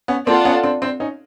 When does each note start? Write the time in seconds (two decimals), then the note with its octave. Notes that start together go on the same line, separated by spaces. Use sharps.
0.08 B3 C#4
0.27 A#3 C4 F4 A4 D5 F#5 A5
0.45 B3 C#4
0.63 C4 D4
0.82 C4 D4
1.00 C#4 D#4